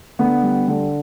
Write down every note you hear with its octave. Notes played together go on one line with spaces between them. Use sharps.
D3 B3
G3
D3